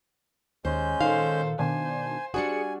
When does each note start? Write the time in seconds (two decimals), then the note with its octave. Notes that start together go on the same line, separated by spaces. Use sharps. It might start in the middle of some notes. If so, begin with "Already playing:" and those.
0.65 D#2 G#3 C#4 C5 G6
1.01 A#2 D#3 A4 C5 F5
1.59 B2 D#3 D4 C5 G#5
2.34 G3 D4 F#4 G#4 G#5 C#7